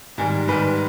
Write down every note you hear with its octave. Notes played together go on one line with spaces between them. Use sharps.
G#2 D#3 G3 G#5
G#2 D#3 G3 B4